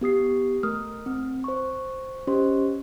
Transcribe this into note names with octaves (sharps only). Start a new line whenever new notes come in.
B3 G4 D#6 C7
A3 A#4 D#6 F6
C4
C5 C#6
C#4 G4 C5 D#5 C6